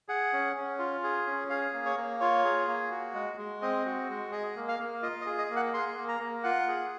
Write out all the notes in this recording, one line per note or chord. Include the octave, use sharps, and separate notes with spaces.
G#4 F#5
C#4
C#4
F4
G#4
C#4
G#4 F5
A#3
C#5
A#3
F4 C#5
G#4
A#3
F#4
G#3
G#3
C4 D#5
F#4
G#3
G#4 D#5
A#3
F5
A#3
F4 D#5
D#5
G#4
D#5
A#3
F#5
G#4 C6
A#3
A#5
A#3
F4 F#5
G#4